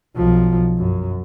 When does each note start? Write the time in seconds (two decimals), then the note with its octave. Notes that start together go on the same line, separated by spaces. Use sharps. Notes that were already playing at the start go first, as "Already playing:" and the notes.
0.16 B1 F3
0.77 F#2